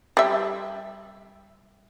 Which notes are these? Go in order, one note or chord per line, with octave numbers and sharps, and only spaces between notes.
G3 E5